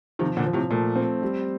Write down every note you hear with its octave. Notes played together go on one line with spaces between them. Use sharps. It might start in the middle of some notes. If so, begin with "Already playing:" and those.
C3 D#3 F3
A#2 D3
F3
A2 C3
A#2 A3
C4
G3